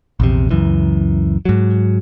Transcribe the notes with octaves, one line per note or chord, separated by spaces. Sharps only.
A#1 E2 C3
C#2 F#2 E3
G#2 F#3